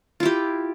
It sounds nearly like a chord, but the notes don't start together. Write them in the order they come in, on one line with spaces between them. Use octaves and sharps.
F4 E4 G4